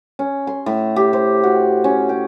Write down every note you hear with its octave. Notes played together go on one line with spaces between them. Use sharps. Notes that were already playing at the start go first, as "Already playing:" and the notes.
C#4
C6
A2
G4
C5
F#4
C#4
G5